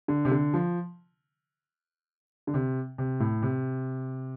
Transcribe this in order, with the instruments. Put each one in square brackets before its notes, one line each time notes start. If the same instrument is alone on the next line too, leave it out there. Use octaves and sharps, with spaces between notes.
[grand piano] D3
C3
D3
F3
D3
C3
C3
A2
C3